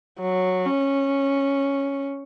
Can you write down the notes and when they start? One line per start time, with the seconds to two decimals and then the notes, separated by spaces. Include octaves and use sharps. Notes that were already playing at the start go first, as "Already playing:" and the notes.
0.20 F#3
0.66 C#4